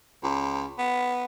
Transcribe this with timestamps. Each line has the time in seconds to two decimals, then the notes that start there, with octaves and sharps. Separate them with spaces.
0.23 C#2
0.78 B3